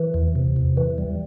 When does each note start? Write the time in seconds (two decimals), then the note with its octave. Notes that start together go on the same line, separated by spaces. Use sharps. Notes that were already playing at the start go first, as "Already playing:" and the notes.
Already playing: E3
0.14 E2
0.36 C3
0.56 E2
0.77 E3
0.98 G3